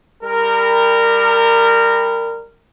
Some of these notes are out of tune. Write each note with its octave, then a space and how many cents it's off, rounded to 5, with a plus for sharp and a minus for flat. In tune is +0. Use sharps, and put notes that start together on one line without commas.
G3 +20 A#4 -15